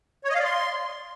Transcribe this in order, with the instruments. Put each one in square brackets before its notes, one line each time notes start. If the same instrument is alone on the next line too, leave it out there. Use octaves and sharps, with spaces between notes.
[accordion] C#5
D#5
F5
D5
C6